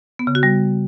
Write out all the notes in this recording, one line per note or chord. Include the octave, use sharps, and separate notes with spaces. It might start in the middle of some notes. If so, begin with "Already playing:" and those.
B3
C#3
F#4
G3